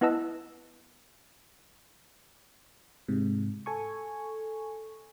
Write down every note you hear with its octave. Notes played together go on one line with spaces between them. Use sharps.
B3 E4 B4 D#5 A5 E6
G#2 C3
A4 G#5 C#6